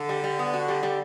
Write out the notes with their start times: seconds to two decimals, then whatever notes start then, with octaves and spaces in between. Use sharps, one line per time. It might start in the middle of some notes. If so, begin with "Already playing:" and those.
Already playing: D3
0.09 G3
0.24 G3
0.39 B3
0.53 F#4
0.68 G3
0.83 G3